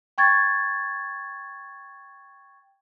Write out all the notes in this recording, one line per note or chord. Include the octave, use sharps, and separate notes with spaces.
G5 C#6 G#6 A6